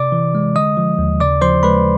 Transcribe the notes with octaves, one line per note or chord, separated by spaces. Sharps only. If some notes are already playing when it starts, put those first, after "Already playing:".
Already playing: C3 D5 D6
E3
G#3
D3 D#5 D#6
F3
D#2
C#3 D5 D6
F3 C5 C6
G#3 B4 B5